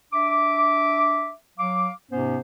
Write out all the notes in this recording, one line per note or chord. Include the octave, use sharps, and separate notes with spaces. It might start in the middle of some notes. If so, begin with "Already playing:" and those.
D4 E5 D6
F#3 F5 D6
G#2 C3 B3 C#4 C5